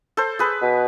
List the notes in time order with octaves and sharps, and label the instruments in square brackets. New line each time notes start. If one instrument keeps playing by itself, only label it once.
[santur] A4 C5
G#4 B4
[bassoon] B2